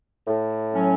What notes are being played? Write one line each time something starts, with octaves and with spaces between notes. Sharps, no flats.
A2
F#3 C#4